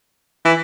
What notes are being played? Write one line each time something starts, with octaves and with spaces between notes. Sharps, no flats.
E3